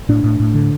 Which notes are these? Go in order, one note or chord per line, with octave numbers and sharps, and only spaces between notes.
A2 D4
A2
A2
D3